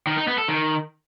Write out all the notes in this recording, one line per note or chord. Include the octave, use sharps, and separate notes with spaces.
D#3
D#4
B3
A4
D#3